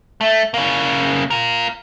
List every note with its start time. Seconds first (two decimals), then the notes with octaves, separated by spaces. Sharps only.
0.21 A3
0.54 C#3 A#3
1.30 F4 A#4